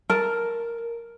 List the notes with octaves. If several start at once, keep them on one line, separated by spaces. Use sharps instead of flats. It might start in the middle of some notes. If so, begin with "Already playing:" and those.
A#4 A5